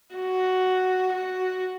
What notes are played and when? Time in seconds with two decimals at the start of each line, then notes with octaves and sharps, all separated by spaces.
0.15 F#4
1.13 F#4